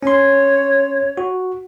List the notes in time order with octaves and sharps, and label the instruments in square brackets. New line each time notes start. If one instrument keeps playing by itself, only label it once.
[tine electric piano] C#4 C6 [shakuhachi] C#5
[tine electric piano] F#4